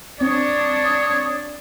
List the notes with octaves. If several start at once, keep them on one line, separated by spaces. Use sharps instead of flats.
C4 D4 C#5 D#6